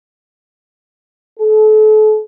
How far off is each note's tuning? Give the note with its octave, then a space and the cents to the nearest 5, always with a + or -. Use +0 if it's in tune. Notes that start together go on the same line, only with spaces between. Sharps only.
A4 -35